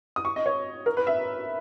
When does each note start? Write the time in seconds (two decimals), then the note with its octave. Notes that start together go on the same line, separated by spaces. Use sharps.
0.16 D#6
0.25 C#6
0.36 D#5
0.46 C#5
0.86 A#4
0.97 B4
1.07 E5